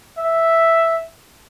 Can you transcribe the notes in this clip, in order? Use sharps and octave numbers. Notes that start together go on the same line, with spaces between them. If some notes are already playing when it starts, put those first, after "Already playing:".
E5